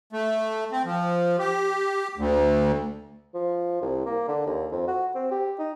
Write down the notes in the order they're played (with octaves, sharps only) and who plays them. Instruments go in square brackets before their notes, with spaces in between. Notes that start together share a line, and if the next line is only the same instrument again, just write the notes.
[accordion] A3
C4
F3
G4
D2
[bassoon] F3
C2
A#3
D3
D#2
F2
F#4
C4
G4
D#4